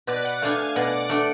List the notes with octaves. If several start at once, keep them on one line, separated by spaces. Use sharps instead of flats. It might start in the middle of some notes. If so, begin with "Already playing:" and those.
B2 B4 D5
D5 F#5
A3 D4 F5 G#5
F5 G#5
B2 D5 F#5
A3 D4